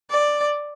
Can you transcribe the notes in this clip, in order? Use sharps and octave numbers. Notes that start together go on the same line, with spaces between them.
D5